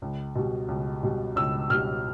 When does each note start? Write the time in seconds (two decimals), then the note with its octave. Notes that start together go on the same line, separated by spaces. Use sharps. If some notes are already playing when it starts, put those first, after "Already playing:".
0.02 C#2
0.35 B2 G3
0.68 C#2
1.03 B2 G3
1.36 C#2 E6
1.70 B2 G3 F6